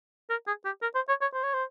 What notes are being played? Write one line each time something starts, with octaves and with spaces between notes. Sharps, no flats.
A#4
G#4
G4
A#4
C5
C#5
C#5
C5
C#5
C5